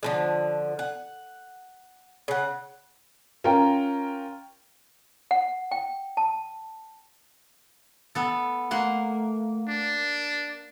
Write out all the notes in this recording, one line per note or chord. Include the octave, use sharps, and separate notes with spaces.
D3 F3 G#3
F#5
C#3 F#5
C#4 F4 A#4 G5 A#5
F#5
G5
A5
B3 A4
A3 A#3 F#5 C6
D4